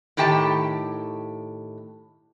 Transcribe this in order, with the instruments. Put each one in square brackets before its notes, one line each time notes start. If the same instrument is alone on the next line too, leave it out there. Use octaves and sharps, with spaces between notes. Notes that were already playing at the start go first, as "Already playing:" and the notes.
[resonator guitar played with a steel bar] A2 D#3 G4 G5 A5